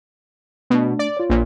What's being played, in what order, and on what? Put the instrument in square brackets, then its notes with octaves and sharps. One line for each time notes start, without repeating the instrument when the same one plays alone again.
[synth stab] B2 [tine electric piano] A3 D4
[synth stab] D5
[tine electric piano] F4 C#5
[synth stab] A#1 A#2